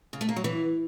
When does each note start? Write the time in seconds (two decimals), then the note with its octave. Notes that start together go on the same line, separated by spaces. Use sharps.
0.13 C#3
0.21 A3
0.29 A#3
0.36 F#3
0.44 E3